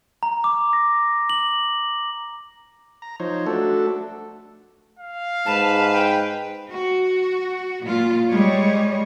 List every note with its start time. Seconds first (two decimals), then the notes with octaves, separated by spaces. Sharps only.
0.23 A#5
0.44 D6
0.73 A#6
1.30 F#7
3.02 A#5
3.20 F3 D#4 C5 C#5
3.46 A3 D4 F#4 A4
4.99 F5
5.46 G#2 B4 A5
5.93 G5
6.69 F#4
7.83 A#2 F4
8.29 G3 G#3 C#5